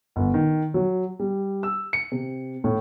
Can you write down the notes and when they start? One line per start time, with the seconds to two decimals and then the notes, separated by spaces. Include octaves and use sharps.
0.16 G1
0.34 D#3
0.74 F#3
1.20 G3
1.63 E6
1.93 C#7
2.12 C3
2.64 A2